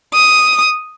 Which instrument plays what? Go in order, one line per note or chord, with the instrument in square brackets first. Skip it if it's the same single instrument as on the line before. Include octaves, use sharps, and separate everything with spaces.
[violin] D#6